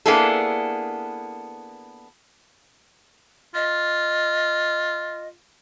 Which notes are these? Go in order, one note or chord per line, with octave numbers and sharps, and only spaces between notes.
A#3 B3 D4 E4 G#4 A4
F4 D#5